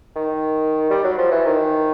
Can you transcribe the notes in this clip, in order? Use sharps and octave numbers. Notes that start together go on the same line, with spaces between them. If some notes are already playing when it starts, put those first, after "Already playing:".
D#3
G3
F#3
F3
E3
D#3